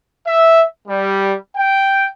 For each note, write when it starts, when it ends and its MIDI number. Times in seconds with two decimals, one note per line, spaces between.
0.26 0.65 76
0.88 1.35 55
1.56 2.09 79